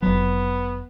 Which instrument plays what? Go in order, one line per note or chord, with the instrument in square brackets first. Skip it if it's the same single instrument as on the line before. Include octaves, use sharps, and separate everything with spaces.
[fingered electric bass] F1 F#3 [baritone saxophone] B3